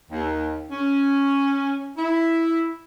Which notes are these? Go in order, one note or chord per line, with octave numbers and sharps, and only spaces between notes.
D#2
C#4
E4